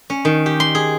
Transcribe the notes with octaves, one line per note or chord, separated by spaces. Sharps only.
C#4
D#3
G4
C6
G#4